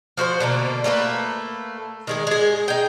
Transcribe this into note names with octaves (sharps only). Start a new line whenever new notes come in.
F3 F#4 B4 C5
B2 D3 A#3
A3 A#3 G4 B4
D#3 G#3 G#4
G#3 G#4
D#4 G5